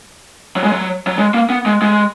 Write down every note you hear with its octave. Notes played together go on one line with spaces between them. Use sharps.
F#3
G#3
F#3
F#3
G#3
A#3
B3
G#3
G#3